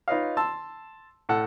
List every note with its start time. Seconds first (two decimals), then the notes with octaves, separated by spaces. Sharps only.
0.08 D#4 F4 B4 C#5 D#5 F5
0.37 A5 C6 E6
1.29 A2 A4 F#5